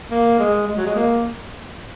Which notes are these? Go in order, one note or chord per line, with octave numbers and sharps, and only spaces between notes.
A#3
G#3
G#3
F#3
G#3
A#3